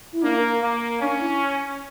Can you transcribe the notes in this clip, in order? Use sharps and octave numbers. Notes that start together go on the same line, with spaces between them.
E4
A#3 D4
A#4
A#3
C#4 D4
E4